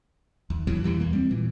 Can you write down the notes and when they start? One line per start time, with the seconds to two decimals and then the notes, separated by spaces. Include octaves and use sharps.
0.50 D#2
0.67 G2 B2 E3 F#3
0.84 E2 E3 G3
1.00 E2 A#3
1.13 G3 C4
1.30 A#2 E3